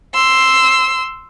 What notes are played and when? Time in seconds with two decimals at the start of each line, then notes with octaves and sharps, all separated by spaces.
0.14 C6 E6